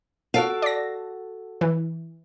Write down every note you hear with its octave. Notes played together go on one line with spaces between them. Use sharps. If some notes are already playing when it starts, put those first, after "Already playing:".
F#4 A4 F5 D7
D5 A#6
E3